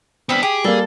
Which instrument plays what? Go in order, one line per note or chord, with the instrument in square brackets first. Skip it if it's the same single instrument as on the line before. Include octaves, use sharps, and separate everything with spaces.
[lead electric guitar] B3 D4 [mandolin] C4 B5 F6
[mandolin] G4 [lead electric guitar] G#4
[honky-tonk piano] G3 A#3 [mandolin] A4